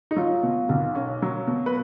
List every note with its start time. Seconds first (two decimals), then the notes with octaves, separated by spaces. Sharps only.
0.11 D#4
0.16 F#3 F4
0.43 B2
0.69 B1
0.95 C#4
1.22 F#3
1.47 B2
1.66 B4